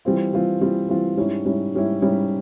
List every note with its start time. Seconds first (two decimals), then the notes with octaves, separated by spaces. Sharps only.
0.05 E3 G3 C4 F4
0.33 E3 G3 C4 F4
0.61 E3 G3 C4 F4
0.89 E3 G3 C4 F4
1.17 G#2 G3 C#4 E4
1.45 G#2 G3 C#4 E4
1.73 G#2 G3 C#4 E4
2.01 G#2 G3 C#4 E4